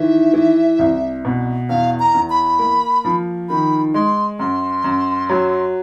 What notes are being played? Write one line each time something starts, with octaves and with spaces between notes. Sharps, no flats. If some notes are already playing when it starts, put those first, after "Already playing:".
Already playing: D#3 E3 E5
E3
C2
B2
E2 F5
A#5
E2
B5
A#3
F3
D#3 B5
G#3 C6
F#2 C6
F#2
F#3